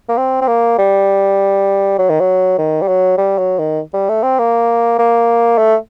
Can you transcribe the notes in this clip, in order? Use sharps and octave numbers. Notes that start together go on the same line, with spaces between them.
A#3
C4
C4
A#3
G3
F#3
D#3
F#3
D#3
G3
F#3
G3
F#3
D#3
G3
A3
C4
A#3
A#3
A3